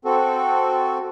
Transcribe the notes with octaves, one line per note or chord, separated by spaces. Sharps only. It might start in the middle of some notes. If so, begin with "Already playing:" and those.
C4 F#4 A4